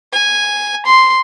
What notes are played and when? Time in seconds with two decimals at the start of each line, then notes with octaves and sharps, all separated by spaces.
0.12 G#5
0.86 C6